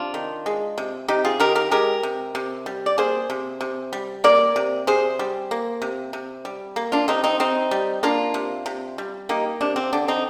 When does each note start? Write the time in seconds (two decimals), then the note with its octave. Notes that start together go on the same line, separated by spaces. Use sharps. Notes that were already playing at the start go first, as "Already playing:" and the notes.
Already playing: C3 D4 F4
0.14 D#3
0.46 G#3
0.78 C3
1.08 C3 D#4 G4
1.25 F4 G#4
1.40 D#3 G4 A#4
1.55 G4 A#4
1.71 G#3 G4 A#4
2.03 C3
2.35 C3
2.66 G3
2.86 D5
2.98 A#3 G#4 C5
3.30 C3
3.61 C3
3.93 G3
4.24 A#3 A#4 D5
4.56 C3
4.87 C3 G#4 C5
5.19 G3
5.51 A#3
5.82 C3
6.13 C3
6.45 G3
6.76 A#3
6.92 D4 F4
7.08 C3 C4 D#4
7.24 C4 D#4
7.40 C3 C4 D#4
7.71 G3
8.03 A#3 D4 F4
8.34 C3
8.66 C3
8.98 G3
9.29 A#3 D#4 G4
9.61 C3 D4
9.76 C4
9.93 D3 D4
10.08 C4 D#4